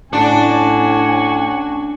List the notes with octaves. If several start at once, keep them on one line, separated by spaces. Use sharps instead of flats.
A2 C#4 D4 F#4 G#5